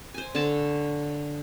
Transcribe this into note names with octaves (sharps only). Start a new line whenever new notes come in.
C5 G#5
D3 A4 C#5 A5